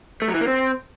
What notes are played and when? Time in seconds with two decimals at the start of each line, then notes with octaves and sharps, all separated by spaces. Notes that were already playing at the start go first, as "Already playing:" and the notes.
0.22 A3
0.28 F#3
0.35 E3
0.41 A#3
0.48 C4